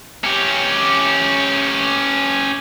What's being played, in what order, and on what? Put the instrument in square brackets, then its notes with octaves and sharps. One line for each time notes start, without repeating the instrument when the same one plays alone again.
[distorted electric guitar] C#4 G4